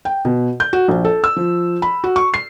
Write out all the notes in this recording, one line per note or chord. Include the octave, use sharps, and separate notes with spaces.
G5
B2
G6
F#4
A#1
A4
E6
F3
B5
F#4
C#6
C7